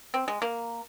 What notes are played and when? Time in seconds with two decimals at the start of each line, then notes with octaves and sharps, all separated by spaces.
0.14 C4
0.28 G#3
0.42 A#3